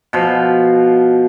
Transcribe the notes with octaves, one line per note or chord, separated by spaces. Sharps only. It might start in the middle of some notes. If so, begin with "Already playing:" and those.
B2 F3